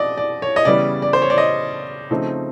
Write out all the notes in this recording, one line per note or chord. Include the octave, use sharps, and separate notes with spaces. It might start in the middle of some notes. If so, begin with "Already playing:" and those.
Already playing: B2 C4 D5 D#5
D5
C#5
D#5
C#3 E3 G3 B3 D5
D5
C5
C#5
D5
D#5
C#3 F3 A3 C4 D#4